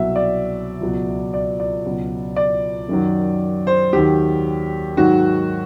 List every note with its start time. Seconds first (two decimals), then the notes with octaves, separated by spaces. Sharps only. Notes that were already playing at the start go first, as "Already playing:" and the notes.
Already playing: C2 B2 F#3 E5
0.16 D5
0.80 C#2 B2 F#3
1.34 D5
1.60 D5
1.85 C#2 B2 F#3
2.36 D5
2.89 F#2 D#3 F#3
3.67 C5
3.93 D#2 D#3 F#3 G4
4.97 G#2 D#3 F#3 F#4